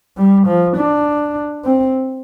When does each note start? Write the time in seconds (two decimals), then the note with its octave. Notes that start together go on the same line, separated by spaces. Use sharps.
0.17 G3
0.47 F3
0.76 D4
1.65 C4